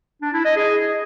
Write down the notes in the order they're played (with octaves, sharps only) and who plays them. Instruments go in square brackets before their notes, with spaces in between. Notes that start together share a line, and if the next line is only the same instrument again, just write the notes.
[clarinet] D4
E4
D#5
G#4